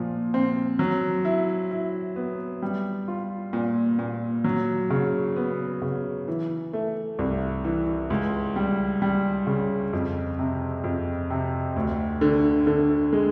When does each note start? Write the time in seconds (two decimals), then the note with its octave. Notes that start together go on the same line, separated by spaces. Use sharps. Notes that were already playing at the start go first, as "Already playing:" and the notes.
Already playing: A#2 F3
0.34 C4
0.79 F#3
1.25 E4
1.71 E4
2.16 B3
2.62 G3
3.08 F4
3.53 A#2
3.99 A#2
4.44 F#3
4.90 C#3
5.36 B3
5.82 C#3
6.28 E3
6.73 A3
7.19 C2
7.65 E3
8.10 C#2
8.56 G3
9.02 G3
9.47 C#3
9.93 F2
10.39 C3
10.84 F2
11.30 C3
11.76 D2
12.21 D3
12.67 D3
13.13 G#3